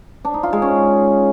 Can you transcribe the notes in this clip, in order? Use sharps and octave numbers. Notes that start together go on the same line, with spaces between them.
D4
D#4
F4
G#3
C#4